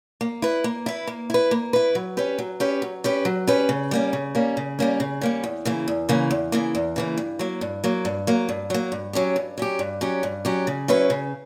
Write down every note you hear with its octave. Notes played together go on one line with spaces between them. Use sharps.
A#3
E4 B4
A#3
E4 B4
A#3
E4 B4
A#3
E4 B4
F#3
C#4 G4 B4
F#3
C#4 G4 B4
F#3
C#4 G4 B4
F#3
C#4 G4 B4
C#3
G3 A#3 C#4
C#3
G3 A#3 C#4
C#3
G3 A#3 C#4
C#3
G3 A#3 C#4
E2
C#3 E3 A#3
E2
C#3 E3 A#3
E2
C#3 E3 A#3
E2
C#3 E3 A#3
G2
F#3 A#3
G2
F#3 A#3
G2
F#3 A#3
G2
F#3 A#3
G2
F#3 C#4 G4
G2
F#3 C#4 G4
G2
F#3 C#4 G4
G2
F#3 C#4 G4
C#3
F#3 C#4 E4 B4
C#3